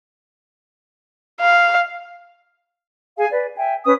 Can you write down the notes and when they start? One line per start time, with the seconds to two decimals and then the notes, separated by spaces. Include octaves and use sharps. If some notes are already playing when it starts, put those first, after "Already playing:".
1.40 F5
3.17 G#4 F5 G#5
3.31 B4 D5
3.56 E5 G5 G#5
3.85 C#4 B4 D#6